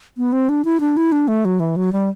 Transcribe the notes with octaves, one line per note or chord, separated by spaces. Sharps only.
B3
C4
D4
E4
D4
E4
D4
A3
F#3
E3
F#3
G3